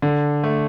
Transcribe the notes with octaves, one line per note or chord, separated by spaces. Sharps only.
D3
A3